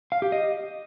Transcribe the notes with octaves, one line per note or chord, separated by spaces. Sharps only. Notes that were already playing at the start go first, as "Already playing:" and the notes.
F5
G4
D#5